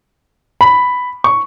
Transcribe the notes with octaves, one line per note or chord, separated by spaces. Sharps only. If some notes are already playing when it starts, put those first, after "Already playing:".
B5
C#6